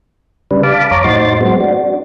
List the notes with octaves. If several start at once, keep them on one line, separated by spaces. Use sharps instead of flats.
C#3 G3 D4 B4
F5 A5 B5 D6
F2 C#5 A#5 D6
A2 D#4 F#4 C5 C6 A6
F#3 G#3 B3 C4 F#4
D4 F#4